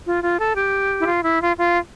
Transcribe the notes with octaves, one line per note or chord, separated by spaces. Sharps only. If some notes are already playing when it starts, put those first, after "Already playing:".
F4
F4
A4
G4
E4
F4
E4
F4
F4